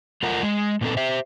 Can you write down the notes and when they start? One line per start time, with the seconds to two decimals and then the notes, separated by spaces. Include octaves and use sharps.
0.23 A3 F4 A#4 F#5
0.43 G#3
0.81 A#2 B3 C4 A4
0.97 G4 C5 E5